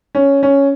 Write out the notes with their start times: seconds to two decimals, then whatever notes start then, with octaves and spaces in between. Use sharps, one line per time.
0.15 C#4
0.43 C#4